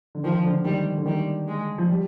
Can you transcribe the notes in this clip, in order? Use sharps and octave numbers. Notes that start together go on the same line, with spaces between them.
D3
D#3 F3
D3
D#3 G3
D3
D#3 G3
G#3
F3
G3